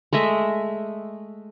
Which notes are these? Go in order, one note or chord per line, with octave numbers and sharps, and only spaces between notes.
G#3 A3 D#5 E5